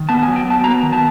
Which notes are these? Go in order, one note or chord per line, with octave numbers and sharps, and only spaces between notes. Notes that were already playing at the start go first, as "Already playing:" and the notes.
Already playing: D#3
B3 A5
G#5
F#3
G5
B3 A5
B3 A#5
D#3
A5